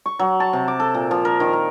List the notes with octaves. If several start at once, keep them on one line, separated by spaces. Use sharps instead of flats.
C#6
F#3
A5
C3
D6
A4
A#2
F3
A#4
D#3
A#4